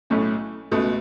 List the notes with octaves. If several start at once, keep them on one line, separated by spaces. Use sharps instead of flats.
B1 A2 A3 C#4
C#2 B2 A3